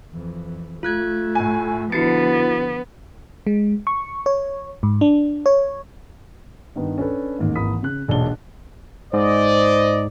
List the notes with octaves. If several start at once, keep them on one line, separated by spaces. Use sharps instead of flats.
F2 E3
A3 F4 F#6 G#6
A2 G#5
D3 F3 B3 E4 F#4 A6 C7 C#7
G#3
C#6
C#5
G#2
D4
C#5
G2 D#3 B3
C#4 D4 A4 B4
A1 D#2 G#2
G#1 E3 A#3 B5 D#6 B6
C#3 F#6
E1 B1 A#2 D4 A5 G7
G#2 C5 D5 D#5